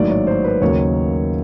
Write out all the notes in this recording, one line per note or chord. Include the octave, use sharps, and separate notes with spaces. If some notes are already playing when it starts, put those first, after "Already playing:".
Already playing: A1 G#2 D#3 F#3 A#3 D5
C#5
C5
B4
D#2 C#3 F#3 A#3 C#5